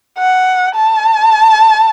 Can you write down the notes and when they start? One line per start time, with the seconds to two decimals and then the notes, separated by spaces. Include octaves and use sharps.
0.19 F#5
0.75 A5